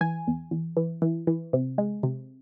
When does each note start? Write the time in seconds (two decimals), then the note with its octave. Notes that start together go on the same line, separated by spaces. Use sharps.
0.01 E3 G#5
0.27 E2
0.51 E2
0.77 E3
1.02 E3
1.27 E3
1.53 C3
1.78 G#3
2.03 C3